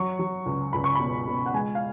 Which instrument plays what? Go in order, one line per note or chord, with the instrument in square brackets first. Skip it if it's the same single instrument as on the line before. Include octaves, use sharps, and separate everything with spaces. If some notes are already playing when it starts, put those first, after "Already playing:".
Already playing: [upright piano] F#3 C#6
F#3
C#2
C#2 B5
C#6
B2 B5
B2
F#5
G#3 G#5
F5